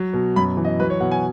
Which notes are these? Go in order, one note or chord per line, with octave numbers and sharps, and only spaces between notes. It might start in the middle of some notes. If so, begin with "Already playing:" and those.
Already playing: F#3
B2
F#2 B5
E3
D#5
F#3 B4
C#5
B2 F#5
G#5